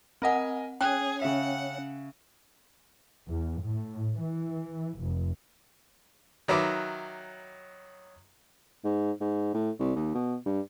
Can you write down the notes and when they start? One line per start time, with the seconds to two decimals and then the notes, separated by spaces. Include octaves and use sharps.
0.22 C4 A#4 D#5 F#5 G#5
0.81 C#4 G#4 G5 F#6
1.22 C#3 E5 F#5
3.28 E2
3.62 A2
4.19 E3
4.99 F1
6.48 D#3 F#3 B4 E5 D6
8.84 G#2
9.21 G#2
9.54 A2
9.79 C2
9.95 D#2
10.15 B2
10.46 G2